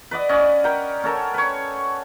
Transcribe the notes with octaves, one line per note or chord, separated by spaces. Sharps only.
B4 D5 D#5 F#5
C#4 D5 D#5
A#4 F#5 G5 B5
C#4 A4 A#4
B4 C#5